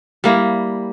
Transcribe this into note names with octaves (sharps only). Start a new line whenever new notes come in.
G3 A#3 E4